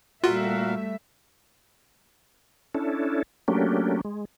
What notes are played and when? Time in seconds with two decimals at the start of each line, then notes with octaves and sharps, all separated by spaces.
0.24 A#2 G3 A3 F4 F#4 A#4 E5 F5
2.74 C#4 D4 E4 A4
3.48 F#3 A3 A#3 C#4 D4 G4
4.05 G#3